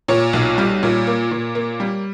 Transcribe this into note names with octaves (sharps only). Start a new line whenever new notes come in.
A#2 C#5
B1
G3
A#2
A#3
A#2
A#3
G3